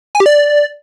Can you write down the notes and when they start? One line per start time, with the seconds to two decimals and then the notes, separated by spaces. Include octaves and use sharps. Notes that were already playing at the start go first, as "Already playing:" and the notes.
0.15 G#5
0.20 G4
0.26 D5